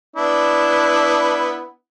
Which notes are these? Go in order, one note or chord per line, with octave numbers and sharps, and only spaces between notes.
B3 D4 E4